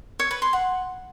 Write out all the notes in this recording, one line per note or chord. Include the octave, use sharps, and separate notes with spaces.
C#5
B4
C6
F#5